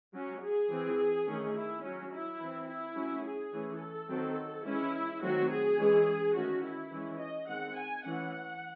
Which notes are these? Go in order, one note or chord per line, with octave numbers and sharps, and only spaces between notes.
F#3 C#4
G#4
E3 C4
D#3 A3 C#4
E4
F#3 C#4
E4
E3 C4
E4
F#3 A3 C#4
G#4
E3 A3 C#4
A4
D#3 F#3 C4
E3 G#3 C#4 E4
D#3 F#3 A3 C4 F#4
G#4
E3 G#3 C#4
D#3 A3 C#4 F#4
E4
E3 G#3 C#4
D#5
D#3 G#3 C4 F#5
G#5
E3 A3 C#4 F#5